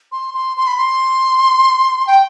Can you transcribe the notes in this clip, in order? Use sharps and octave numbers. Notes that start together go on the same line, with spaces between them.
C6
C6
C6
B5
C6
G5